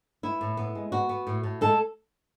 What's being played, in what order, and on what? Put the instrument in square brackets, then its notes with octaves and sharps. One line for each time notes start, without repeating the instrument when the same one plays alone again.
[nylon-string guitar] B3 E4
A2
B3
G#3
B3 F#4
B3
A2
A2
G#3 A4